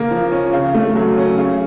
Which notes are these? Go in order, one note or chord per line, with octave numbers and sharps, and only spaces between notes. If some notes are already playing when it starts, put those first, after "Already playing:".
Already playing: C#3 A#3
F3
C#4
C#3
A3
F#3
C#4
C#3